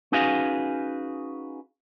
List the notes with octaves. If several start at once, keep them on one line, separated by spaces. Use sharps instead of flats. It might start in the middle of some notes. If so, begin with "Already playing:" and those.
C#4 D#4 F#4 G#4 B4 F5